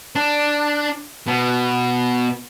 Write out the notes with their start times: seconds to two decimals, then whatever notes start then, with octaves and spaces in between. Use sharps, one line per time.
0.16 D4
1.27 B2